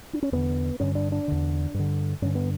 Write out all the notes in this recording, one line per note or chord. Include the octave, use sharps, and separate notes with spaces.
D4
C#4
E2 D3 B3
G2 D3 C#4
D4
D4
E2 D3
G2
D3
G2 D3 C#4
B3